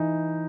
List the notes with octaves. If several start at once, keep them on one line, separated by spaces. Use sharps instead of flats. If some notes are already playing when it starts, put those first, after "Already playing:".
Already playing: E3 D#4